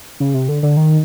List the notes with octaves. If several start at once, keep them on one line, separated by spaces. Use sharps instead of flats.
C#3
C3
D3
D3
D#3